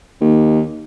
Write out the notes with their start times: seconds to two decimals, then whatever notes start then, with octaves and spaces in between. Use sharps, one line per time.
0.21 D#2